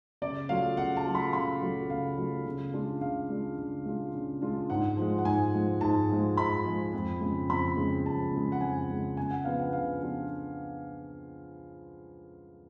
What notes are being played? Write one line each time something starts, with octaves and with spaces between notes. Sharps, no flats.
C#3 D5
F#3 A3 F4 F5
C#3 F#5
A5
F#3 A3 F4
B5
C#3 B5
F#3 A3 F4
C#3 F5
F#3 A3 F4
C#3
G#3 D4 F4
C#3 F5
G#3 D4 F4
C#3
G#3 D4 F4
C#3
G#3 D4 F4
G#2 F#5
F3 G#3
F#5
G#2 G#5
F3 G#3
G#2 A5
F3 G#3
G#2 B5
F3 G#3
F2
C#3 G#3
F2 B5
C#3 G#3
F2 A5
C#3 G#3
F#5
F2 G#5
C#3 G#3
C#3 G#5
F#5
F3 B3 D4 F4 F5
F#5
C#3 F5
F3 B3 D4 F4